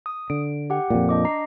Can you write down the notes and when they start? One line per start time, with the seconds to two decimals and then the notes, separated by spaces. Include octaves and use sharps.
0.06 D#6
0.30 D3 D7
0.70 G4 F#5 G5
0.90 F2 A#2
1.09 D4 D#5 D6
1.25 A#5 C7